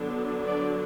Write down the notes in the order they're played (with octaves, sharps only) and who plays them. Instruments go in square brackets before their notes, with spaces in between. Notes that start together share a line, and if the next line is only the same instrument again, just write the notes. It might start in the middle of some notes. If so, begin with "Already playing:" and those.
Already playing: [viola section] D3 F#3 B3 D4
D5